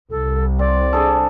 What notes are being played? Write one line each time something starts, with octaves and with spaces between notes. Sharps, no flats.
C2 A4
C4 D5
D4 G#4 A4